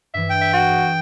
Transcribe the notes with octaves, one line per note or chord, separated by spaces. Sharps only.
G2 E3 E5
G5
E5
F#4
G#4